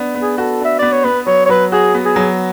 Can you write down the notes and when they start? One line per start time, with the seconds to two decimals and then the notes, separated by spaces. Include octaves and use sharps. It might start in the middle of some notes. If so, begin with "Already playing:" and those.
Already playing: B3 D4
0.15 B3
0.21 G#4
0.38 F#4 A4
0.60 D4 E5
0.79 B3 D5
0.92 C#5
1.04 B3 B4
1.27 F#3 C#5
1.45 C#5
1.49 F#3 B4
1.72 F#4 G#4
1.94 B3
2.05 G#4
2.16 F#3